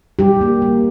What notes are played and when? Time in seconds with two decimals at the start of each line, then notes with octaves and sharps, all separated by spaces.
0.19 G3 G4
0.41 A#3
0.62 A#3